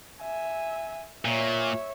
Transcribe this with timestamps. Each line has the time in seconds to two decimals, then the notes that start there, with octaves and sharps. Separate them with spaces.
0.21 E5 G#5
1.25 A#2 C#5 E5